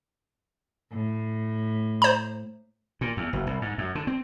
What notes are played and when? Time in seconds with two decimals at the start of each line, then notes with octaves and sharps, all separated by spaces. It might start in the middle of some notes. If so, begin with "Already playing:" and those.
0.92 A2
2.02 C5 A#5
3.01 A#2
3.17 E2
3.33 F#1
3.47 C2
3.62 G#2
3.78 F#2
3.95 D3
4.07 C4